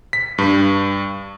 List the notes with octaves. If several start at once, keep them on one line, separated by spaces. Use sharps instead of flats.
B6
G2